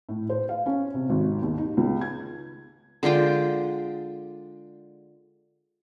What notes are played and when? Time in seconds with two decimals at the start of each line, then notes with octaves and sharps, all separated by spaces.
0.09 A2
0.29 C5
0.49 F5
0.66 C#4
0.94 C3
1.10 G#1
1.42 D#2
1.58 D#4
1.77 C#2
2.01 G#6
3.03 D3 G#3 F4 G5